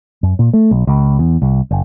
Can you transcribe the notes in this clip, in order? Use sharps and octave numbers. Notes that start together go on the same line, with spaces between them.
F#2
A#2
A3
B1
C#2
E2
C2
F#1